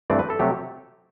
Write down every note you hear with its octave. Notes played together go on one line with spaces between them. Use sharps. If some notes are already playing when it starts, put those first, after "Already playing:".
G2 E3 A3 C4 D5
B4
A4
C3 F#3 A3 G4